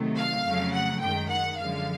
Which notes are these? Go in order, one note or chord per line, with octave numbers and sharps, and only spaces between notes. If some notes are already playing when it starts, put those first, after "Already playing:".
Already playing: C3 D#3 F#3 A3
F5
F2 C#3 F#3 A3
F#5
F#2 D#3 G#3 G5
F#5
F#2 D3 F3 G#3 F5